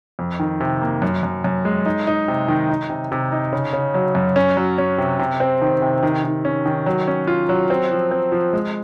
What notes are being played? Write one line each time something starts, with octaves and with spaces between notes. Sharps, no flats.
F2
D#3
C3
A#3
F#2
F#2
F#2
G#3
D#4
D#4
C3
D#3
D#4
C3
C3
D#4
C#3
C#3
F#3
F#2
C#4
F#3
C#4
C3
C3
C4
D#3
C3
D#3
D#3
C#4
D#3
F#3
C#4
F4
F#3
C4
F3
C4
F3
G#3